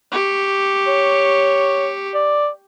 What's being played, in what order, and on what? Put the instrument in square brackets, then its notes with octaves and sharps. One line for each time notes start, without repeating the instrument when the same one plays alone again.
[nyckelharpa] G4 C#6
[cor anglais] C#5
D5